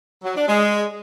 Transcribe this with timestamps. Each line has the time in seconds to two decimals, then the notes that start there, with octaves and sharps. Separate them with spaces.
0.23 F#3
0.35 D4
0.47 G#3